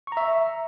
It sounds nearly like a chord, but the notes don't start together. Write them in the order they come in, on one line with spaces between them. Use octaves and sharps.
C#6 A#5 E5